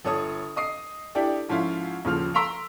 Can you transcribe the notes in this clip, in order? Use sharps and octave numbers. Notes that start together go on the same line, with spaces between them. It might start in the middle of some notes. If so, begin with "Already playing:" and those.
G1 A4 C#5 D#6
D#5 D#6 C7
D4 E4 G4 A4 D5
G#2 F3 C#4 E4 F4
D#1 C#3 F3 F6
A#5 C6 E6 B6 D7 F7